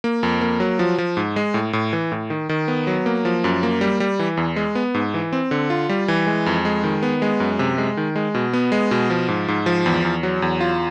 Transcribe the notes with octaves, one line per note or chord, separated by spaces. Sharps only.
A#3
F2
A#3
F#3
F3
F3
G#2
G#3
A2
A2
E3
A2
D#3
D#3
B3
F#3
A#3
F3
F#2
A#3
G3
G3
E3
E2
G#3
B3
G#2
E3
C4
D3
F4
G3
E3
G#3
F2
G#3
D#3
B3
G#3
F#2
C3
G#3
D#3
G#3
B2
B3
G#3
B2
F3
G#2
G#2
F3
E2
E2
F#3
E2
F4